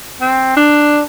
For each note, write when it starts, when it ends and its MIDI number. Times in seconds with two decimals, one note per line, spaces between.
0.21 0.52 60
0.57 1.01 62